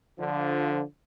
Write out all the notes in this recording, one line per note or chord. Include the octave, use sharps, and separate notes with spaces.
D3 F3